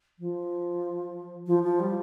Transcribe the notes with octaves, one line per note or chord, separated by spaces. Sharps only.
F3
F3
F3
G3